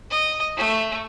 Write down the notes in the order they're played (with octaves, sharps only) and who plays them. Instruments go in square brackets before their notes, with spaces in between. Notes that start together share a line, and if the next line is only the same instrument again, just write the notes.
[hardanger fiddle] D#5
A3